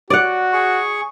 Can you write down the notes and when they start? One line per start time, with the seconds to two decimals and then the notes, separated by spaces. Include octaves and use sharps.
0.10 F#4 D5 F#5
0.53 G#4 C#6